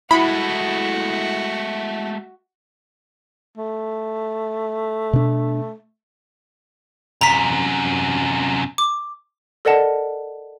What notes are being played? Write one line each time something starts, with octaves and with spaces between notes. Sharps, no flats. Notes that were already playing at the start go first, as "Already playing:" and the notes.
G#3 A3 E4 F#4 B5
A3
B2 D4
F#2 C3 A#5 B6
D6
A4 A#4 D5 D#5 F#5 A5